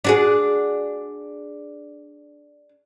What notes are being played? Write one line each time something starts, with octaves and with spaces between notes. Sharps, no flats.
D4 F#4 G#4